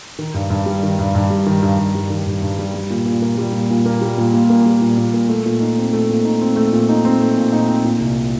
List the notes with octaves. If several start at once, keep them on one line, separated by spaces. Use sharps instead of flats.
D#3
G2
G2
G3
D#3
G2
G2
G3
D#3
G2
G2
G3
D#3
G2
G2
G3
G3
A#2
A#2
A#3
G3
A#2
A#2
A#3
G3
A#2
A#2
A#3
G3
A#2
A#2
A#3
A3
A#2
D#4
C4
A3
A#2
D#4
C4
A3
A#2
D#4
C4
A3
A#2
D#4
C4
A#2
C2